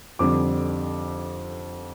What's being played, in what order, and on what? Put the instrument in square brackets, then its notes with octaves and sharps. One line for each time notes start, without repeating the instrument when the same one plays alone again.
[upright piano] F2 D3 G3 D6